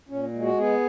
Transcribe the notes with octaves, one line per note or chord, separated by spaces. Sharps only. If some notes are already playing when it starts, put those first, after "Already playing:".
A#2 C#4
G#3
F#4
B3 G#4